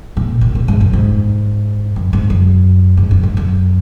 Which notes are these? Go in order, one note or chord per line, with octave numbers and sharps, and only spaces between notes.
A#2
A#2
A#2
G#2
F#2
G#2
F#2
G#2
F#2
G#2
F#2
G#2
F#2